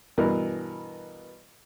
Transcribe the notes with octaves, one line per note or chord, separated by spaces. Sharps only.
G2 B2 E3 B3 A#4